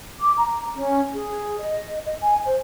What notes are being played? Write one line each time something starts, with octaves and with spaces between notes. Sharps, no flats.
D6
A#5
C#4
G#4
D#5
D#5
G#5
C5